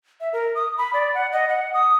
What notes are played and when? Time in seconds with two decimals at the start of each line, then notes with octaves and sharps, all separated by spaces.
0.21 E5
0.33 A#4
0.55 D#6
0.78 B5
0.94 D5
1.15 F#5
1.32 D#5
1.49 F#5
1.74 D#6